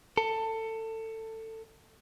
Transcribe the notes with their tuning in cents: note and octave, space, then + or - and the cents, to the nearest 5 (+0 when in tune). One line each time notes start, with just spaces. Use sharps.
A4 +20